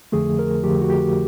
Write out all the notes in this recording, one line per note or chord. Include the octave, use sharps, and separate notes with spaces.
F2 D3 F3 A3 G#4
A#4
F2 D3 F3 A3 G4
F#4
G4